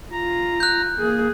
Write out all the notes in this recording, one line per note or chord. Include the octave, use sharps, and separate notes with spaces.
F4 A#5
F#6 G6
A#3 G#4